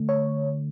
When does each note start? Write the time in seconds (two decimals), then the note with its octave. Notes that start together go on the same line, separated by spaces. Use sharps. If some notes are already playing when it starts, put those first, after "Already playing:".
Already playing: D3 A3
0.09 C#5